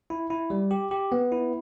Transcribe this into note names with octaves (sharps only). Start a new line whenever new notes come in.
E4
E4
G3
G4
G4
B3
E4